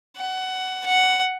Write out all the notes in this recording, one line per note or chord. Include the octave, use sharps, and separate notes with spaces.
F#5
F#5